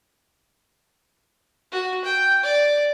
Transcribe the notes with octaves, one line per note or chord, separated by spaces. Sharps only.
F#4
G5
D5